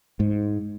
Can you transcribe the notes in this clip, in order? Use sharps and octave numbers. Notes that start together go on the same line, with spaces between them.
G#2